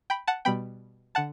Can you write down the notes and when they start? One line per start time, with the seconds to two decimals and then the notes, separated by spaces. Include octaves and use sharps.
0.10 G5 B5
0.28 F#5 A5
0.45 B2 G3 B3 G5 B5
1.15 D3 F#5 A5